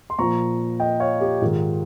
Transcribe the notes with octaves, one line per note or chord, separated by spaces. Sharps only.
C6
A#2 F3 A#5 C#6
D#5 G5
C#5 F5
G4
G#2 D#3 F4